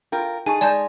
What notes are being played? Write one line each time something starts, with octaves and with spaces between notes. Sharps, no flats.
F4 A#4 G5
D#4 G#4 G#5 A5 C#6
G#3 D5 G#5 A5 G6